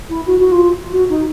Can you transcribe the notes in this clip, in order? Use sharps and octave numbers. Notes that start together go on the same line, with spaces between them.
E4
F#4
F#4
F4
F#4
D#4